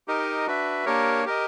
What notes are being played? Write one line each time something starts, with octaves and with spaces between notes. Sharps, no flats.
D#4 G4 A#4 D#5
D4 F#4 B4 E5
A#3 D4 G4 A#4 C#5
G4 A#4 D#5